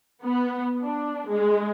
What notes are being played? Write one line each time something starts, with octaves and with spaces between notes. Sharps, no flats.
B3
D4
G#3